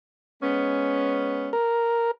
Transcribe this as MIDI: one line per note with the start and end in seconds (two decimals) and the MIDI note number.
0.42 1.50 56
0.42 1.50 59
0.42 1.50 61
1.53 2.11 70